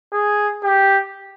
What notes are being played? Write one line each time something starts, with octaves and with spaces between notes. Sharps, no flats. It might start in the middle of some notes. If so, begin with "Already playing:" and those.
G#4
G4